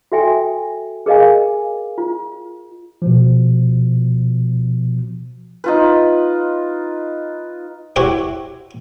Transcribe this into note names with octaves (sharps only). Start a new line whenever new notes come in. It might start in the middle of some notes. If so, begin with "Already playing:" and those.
F#4 A4 E5 G5 G#5
G#4 A#4 D#5 F5 G#5
F4
B2 F3
D#4 F4 B4
E4 F#4 G4 C5 C#5